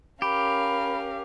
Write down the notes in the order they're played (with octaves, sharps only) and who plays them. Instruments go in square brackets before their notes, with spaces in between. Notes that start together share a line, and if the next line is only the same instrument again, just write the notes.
[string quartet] C#4 A#4 F5 [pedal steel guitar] G4 [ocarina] B5